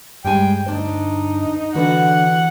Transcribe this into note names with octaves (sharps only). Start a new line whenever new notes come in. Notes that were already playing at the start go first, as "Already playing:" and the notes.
G2 G3 G#3 G5 G#5
D2 D4 D#4 C5
D3 E3 F#4 B4 F#5